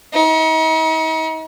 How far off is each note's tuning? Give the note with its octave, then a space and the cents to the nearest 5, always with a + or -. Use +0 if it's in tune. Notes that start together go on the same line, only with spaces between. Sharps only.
D#4 +40